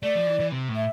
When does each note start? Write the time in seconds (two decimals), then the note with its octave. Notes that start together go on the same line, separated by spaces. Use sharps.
0.03 A3 D5
0.15 F3
0.27 E3
0.40 E3
0.52 C3
0.69 A2
0.76 E5